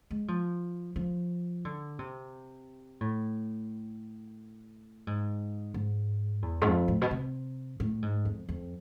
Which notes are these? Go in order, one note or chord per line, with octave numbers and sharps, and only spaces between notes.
G#3
F3
F3
D3
C3
A2
G#2
G#2
E2
G#2
F2
A2
B2
C3
A2
G#2
F2
F2